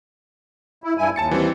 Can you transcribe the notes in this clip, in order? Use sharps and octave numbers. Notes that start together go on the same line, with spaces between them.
E4
G2 E4 G#5
D#2 A5 A6 C#7
E3 G3 C4